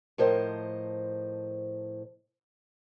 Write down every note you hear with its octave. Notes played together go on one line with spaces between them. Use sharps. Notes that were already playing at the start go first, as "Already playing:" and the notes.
A2 F3 A#4 C5 D#5